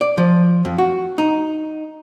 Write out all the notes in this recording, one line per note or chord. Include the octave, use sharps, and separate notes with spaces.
D5
F3
F2
F#4
D#4